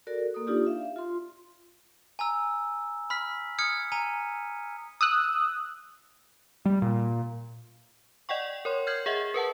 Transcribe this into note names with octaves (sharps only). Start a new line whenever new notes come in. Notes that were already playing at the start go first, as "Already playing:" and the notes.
F#4 A4 A#4 D5
A#3 A4 D#6
D4 D#4 F4 G4 D5
E5 F5
F4 C6
G#5 A#5 E6
B5 F6 B6
D#6 F6 G#6 C#7
G#5 A#5 D#7
D#6 E6 F#6
G3
A#2
D5 D#5 F#5 G5 C#6
A#4 C#5 C6
F6 G6 G#6 C7 F#7
G#4 D#5 E5 F#5
A#4 B4 F#5 A5